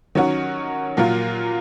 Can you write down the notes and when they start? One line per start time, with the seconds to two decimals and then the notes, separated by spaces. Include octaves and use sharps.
0.15 D#3 F#3 C#4 F#4
0.97 A#2 F#3 A#3 F4